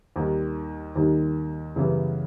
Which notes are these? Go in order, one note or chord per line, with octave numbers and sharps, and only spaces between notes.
D#2 D#3 G3
D#2 D#3 G3
F#2 C#3 E3 G3 B3